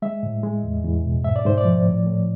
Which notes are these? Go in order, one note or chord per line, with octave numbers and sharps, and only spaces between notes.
G#3 E5
A2
G#3
E2
E2
B2
G#2 E5
D5
G#2 C5
D5
F3
A2
A2